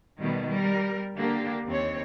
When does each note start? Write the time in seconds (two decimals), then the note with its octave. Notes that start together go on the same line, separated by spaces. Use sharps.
0.20 B2 D#3 G3 A3
0.49 G3 A#4
1.16 D3 A#3 D4 G4
1.66 D#2 C4 C#5